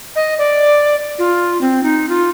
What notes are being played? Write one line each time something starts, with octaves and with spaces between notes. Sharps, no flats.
D#5
D5
F4
C4
D#4
F4